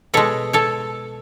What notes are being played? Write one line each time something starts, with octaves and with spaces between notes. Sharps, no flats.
B2 G#3 A4 C#5
A4 C#5